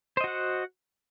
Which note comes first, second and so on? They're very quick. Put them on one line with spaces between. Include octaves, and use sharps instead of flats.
C5 D#5 F#4 F#5